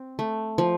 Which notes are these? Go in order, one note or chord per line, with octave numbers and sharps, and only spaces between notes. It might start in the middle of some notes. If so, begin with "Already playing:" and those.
Already playing: C4
A3
F3